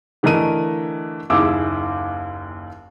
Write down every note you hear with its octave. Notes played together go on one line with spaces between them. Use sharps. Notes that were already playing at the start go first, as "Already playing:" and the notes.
D3 E3 A3 A#4 D#5 D#7
F#1 D#2 E4 G#4 D6 E6